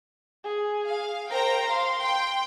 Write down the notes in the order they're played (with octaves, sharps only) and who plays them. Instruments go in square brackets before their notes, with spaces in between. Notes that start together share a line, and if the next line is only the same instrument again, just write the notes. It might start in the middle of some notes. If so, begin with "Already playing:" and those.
[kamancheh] G#4
[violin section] F5
[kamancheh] A#4 [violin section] C5 G5 A#5
[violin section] F5 [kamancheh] C6
[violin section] G5